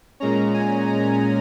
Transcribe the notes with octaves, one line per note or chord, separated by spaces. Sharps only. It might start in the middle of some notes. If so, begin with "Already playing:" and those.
A#2 G#3 C#4 A#5
G#5
A#5